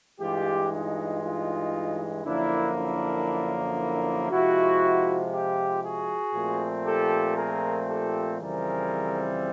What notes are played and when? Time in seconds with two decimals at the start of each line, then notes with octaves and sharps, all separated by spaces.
0.21 G2 E3 G#3 F4 G4
0.72 D#4 F4
1.22 D#4 F4
2.25 F#2 D3 F3 A#3 D4 E4
2.76 D4 E4
3.78 D4 E4
4.30 C3 F3 G#3 E4 F#4
5.32 F4 G4
5.83 F#4 G#4
6.34 A#2 F3 A3 C4
6.86 G4 A4
7.37 G#4 A#4
7.88 G4 A4
8.40 F2 C#3 E3 G3 C4 G#4 A#4